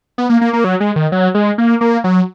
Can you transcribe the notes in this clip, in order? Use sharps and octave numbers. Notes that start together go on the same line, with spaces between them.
B3
A#3
A#3
A#3
F#3
G#3
D#3
F#3
G#3
A#3
A#3
F#3